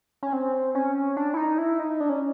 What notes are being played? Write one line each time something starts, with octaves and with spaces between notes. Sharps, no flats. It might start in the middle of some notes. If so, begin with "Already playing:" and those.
C#4
C4
C#4
D4
E4
D#4
E4
D#4
D4
C#4